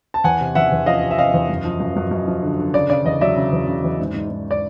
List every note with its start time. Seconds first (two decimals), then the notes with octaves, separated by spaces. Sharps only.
0.14 A5
0.24 E2 F#5 G#5
0.41 C3
0.55 E2 E5 F#5
0.72 E2
0.86 F3 D#5 F5
1.03 C3
1.11 E5
1.18 C3 D#5 F5
1.34 E2
1.49 F#2
1.64 F3
1.80 F#2
1.97 F#2
2.11 F#2
2.27 F3
2.42 D3
2.59 D3
2.74 C#3 D5
2.90 C#3 D5
3.05 E2 D#5
3.21 F#3 D5 E5
3.36 C#3
3.52 E2
3.68 C#3
3.84 E2
4.00 G#2
4.14 G#2
4.31 G#2
4.51 D5